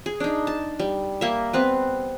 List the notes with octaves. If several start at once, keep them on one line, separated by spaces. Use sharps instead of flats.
G#4
D4 D#4
A5
G3
A#3 E5
B3 C4 B4